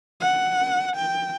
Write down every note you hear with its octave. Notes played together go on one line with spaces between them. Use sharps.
F#5
G5